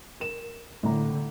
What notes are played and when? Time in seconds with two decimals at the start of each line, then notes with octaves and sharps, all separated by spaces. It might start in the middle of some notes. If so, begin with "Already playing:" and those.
0.20 A#4 E7
0.83 A2 D3 A#5